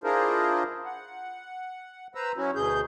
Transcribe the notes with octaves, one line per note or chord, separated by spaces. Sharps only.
D4 E4 F4 G#4 A#4 C5
F#5
B4 C5 A#5 E6
F#3 C#4 E4 F#4
D2 B2 G#4 G6